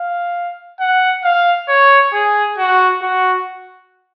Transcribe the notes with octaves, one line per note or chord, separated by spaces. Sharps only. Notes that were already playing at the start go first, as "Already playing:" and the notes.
Already playing: F5
F#5
F5
C#5
G#4
F#4
F#4